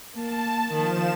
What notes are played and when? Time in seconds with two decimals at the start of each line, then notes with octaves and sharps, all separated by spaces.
0.15 A#3 A5
0.73 D#3 F3 E7